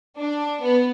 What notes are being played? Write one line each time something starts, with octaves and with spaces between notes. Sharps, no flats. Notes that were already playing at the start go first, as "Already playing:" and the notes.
D4
B3